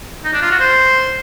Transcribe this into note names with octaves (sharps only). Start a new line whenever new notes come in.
D#4
D4
F4
F#4
C5